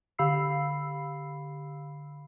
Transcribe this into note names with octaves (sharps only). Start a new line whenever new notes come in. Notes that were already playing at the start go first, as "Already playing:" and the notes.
D3 G4 F5 B5 E6 C7